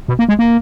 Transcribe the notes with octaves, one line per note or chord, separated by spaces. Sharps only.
B2
A#3
G#3
A#3